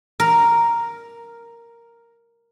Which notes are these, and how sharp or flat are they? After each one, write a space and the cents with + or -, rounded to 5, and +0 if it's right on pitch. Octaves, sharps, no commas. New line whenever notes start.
A#4 +0